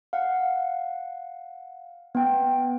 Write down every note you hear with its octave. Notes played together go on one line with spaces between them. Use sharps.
F5 F#5
B3 G5